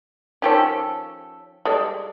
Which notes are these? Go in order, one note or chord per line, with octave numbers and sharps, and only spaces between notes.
D#3 F3 C#4 G4 A4 C#5
G3 G#3 A4 D5